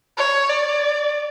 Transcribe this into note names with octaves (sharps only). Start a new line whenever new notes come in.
C#5
D5